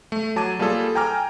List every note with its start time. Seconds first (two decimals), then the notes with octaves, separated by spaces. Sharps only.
0.12 A3
0.36 F#3 A5 D6 G#6 D#7
0.59 G3 A#3 F4 G#4 A4
0.95 G5 G#5 A#5 D6 F6